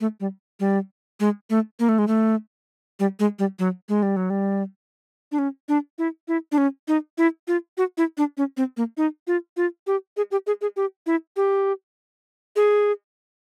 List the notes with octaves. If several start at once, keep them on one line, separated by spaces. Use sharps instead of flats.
A3
G3
G3
G#3
A3
A#3
A3
G#3
A3
G3
G#3
G3
F#3
G#3
G3
F#3
G3
D4
C#4
D4
E4
E4
D4
C#4
D#4
E4
F4
F#4
E4
D4
C#4
C4
A#3
D#4
F4
F4
G4
G#4
G4
G#4
G#4
G4
E4
G4
G#4